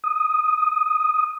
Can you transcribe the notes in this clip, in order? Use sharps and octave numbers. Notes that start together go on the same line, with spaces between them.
D#6